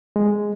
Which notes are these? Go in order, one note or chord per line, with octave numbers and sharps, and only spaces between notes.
G#3